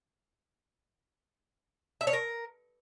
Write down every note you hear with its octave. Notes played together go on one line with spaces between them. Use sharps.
E5
C#5
A#4